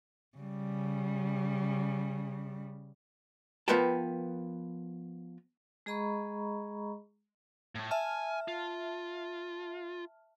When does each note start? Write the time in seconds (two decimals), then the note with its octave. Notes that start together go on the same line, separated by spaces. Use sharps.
0.38 C#3 G3
3.68 F3 B3 A#4 B4 G5 A5
5.86 G#3 G#4 D#5 A#5 B5 C#6
7.75 A2 A3
7.91 E5 G#5 A5 F6
8.48 F4